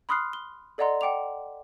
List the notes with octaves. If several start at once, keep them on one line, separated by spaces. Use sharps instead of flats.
B5 C6 D#6 F6 F#6 C7
G7
A4 D5 D#5 F#5 A#5 C6
F#5 G5 D6 F7